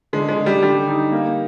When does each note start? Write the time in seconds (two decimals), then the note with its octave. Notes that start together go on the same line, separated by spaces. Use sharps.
0.13 D3 G#3
0.29 G#3
0.37 D3
0.46 G3
0.62 D3 G3
0.87 D#4
1.12 A#3